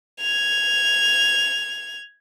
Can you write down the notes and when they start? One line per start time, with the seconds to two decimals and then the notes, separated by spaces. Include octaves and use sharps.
0.20 G#6 F7